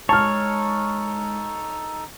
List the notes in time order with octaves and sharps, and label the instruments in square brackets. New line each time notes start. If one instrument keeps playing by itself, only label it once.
[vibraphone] G#3 [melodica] D#4 A4 [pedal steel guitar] C#5 [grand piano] A5 F6